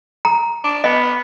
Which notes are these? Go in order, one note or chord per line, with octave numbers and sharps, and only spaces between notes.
A#5
D4
B3 D#5